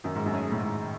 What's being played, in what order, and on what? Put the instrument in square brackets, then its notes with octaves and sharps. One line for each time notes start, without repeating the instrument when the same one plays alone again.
[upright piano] F#2 [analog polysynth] D#3
[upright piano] G#2
F#2
[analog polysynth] F#3 A3 C#4 G#4
[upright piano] A2
[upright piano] G#2 [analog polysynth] D#3